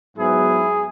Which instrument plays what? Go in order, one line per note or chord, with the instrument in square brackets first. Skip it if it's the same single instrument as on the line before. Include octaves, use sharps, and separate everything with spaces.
[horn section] G#2 F#3 B3 E4 G#4